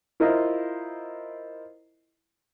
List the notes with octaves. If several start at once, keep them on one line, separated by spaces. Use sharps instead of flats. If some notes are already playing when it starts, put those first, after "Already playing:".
E4 F4 A#4 C5 D#5